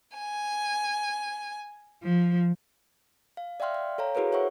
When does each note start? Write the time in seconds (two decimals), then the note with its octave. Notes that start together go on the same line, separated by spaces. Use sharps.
0.16 G#5
2.02 F3
3.37 F5
3.60 D5 E5 F5 G5 C6 F6
3.74 G5
3.98 A4 C#5 F5 A#5
4.15 E4 F#4 G#4 A#4 B4 C#5
4.32 C5 C#5 E5 F#5 C#6